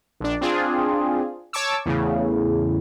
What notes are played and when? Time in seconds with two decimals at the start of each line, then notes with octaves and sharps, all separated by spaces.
0.20 A#1 D4
0.41 C4 D4 F4 G#4
1.53 C#5 A5 C#6 D6 E6
1.86 E2 A2 C#3